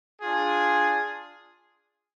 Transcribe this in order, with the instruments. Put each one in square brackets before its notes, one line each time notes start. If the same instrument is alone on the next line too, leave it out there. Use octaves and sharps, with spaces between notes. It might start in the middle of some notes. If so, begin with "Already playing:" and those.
[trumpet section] D4 F4 G#4